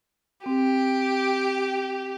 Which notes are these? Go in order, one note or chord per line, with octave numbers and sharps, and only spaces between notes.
C4 G4